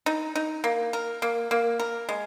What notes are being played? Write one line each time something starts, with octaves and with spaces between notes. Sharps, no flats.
D#4
D#4
A#3
A#4
A#3
A#3
A#4
G#3